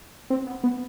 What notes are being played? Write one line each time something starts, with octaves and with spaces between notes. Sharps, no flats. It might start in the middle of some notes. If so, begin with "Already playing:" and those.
C4
B3
B3